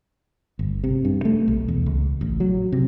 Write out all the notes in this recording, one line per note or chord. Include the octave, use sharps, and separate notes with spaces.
G1
C3
G2
A3
B1
E2
C#2
A1
F#3
C3